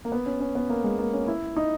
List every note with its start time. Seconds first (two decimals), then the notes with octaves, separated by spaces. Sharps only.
0.05 A#3
0.12 B3
0.26 C#4
0.40 C#4
0.55 B3
0.70 A#3
0.84 G#3
0.99 A#3
1.13 C#4
1.27 E4
1.56 D#4